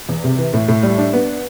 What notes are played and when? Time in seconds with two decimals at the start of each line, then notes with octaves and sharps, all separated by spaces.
0.09 E2
0.24 C3
0.39 E3
0.53 A2
0.68 A2
0.83 G3
0.98 D4
1.13 B3